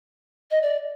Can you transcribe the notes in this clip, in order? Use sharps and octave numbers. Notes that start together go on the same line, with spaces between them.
D#5
D5